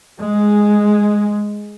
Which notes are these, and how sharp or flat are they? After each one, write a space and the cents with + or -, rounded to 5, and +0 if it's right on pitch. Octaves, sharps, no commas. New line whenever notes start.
G#3 +0